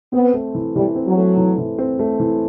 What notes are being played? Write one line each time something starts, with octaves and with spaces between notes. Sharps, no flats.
B3 C4
A3
E3
E3 G3
C4
F#3
A3
E3
E3
C4
A3
E3